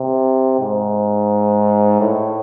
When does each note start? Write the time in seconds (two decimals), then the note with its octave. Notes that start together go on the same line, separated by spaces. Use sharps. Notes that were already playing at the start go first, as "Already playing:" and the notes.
Already playing: C3
0.61 G#2
2.00 A2